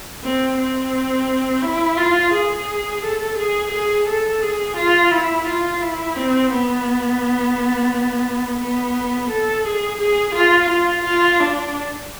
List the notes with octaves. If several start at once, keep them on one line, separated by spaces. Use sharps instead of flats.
C4
C4
E4
F4
G#4
A4
G#4
G#4
A4
G#4
F4
E4
F4
E4
C4
B3
B3
A4
G#4
G#4
F4
F4
F4
D4